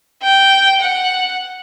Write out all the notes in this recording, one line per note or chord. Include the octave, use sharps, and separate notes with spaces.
G5
F#5